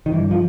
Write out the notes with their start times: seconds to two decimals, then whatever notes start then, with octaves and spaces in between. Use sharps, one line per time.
0.06 D#3
0.12 G2 E3
0.31 F3